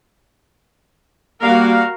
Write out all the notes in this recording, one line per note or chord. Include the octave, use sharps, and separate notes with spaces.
G3 A#3 F#4 A#4 F5